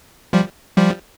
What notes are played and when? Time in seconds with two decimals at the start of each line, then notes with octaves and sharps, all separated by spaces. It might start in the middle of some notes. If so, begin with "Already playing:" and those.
0.33 F3 G3
0.77 F3 G3